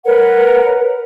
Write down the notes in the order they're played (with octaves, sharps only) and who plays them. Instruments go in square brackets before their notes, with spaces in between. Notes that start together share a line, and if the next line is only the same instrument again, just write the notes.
[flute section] A#4 B4 C#5 F#5